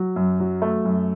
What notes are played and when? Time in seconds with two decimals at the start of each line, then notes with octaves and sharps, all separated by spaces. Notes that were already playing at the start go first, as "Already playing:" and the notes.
Already playing: F#3
0.16 F#2
0.40 F#3
0.62 A3
0.85 F#2